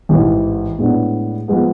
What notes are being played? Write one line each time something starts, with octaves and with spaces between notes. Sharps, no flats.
A1 G#2 E3
A2 G#3 B3 D4
F3 G#3 B3